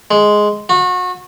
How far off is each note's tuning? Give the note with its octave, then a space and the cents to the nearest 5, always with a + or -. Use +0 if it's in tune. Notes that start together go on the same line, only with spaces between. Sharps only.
G#3 +5
F#4 -30